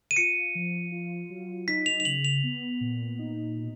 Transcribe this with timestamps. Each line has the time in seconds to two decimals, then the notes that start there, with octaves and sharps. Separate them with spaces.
0.11 D#7
0.16 F4 C#7
0.55 F3
0.92 F4
1.30 F#3
1.68 D#4 B6
1.86 F7
2.00 F7
2.05 C#3 F#7
2.25 F7
2.43 B3
2.81 A#2
3.19 D#4
3.56 B2